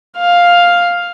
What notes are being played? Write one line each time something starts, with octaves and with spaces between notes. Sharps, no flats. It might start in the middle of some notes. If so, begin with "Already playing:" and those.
F5